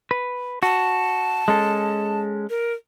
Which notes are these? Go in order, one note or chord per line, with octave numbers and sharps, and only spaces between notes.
B4
F#4 A5
G#3 C#4 A4
A#4